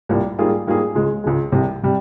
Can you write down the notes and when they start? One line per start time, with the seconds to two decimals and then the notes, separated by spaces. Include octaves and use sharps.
0.09 C2 A#2 G3
0.38 G#2 G3 A#3 F4 G#4
0.67 G#2 G3 A#3 F4 G#4
0.95 C#2 C#3 G#3
1.24 C#2 C#3 G#3
1.52 C2 C3 G3
1.83 C3 G3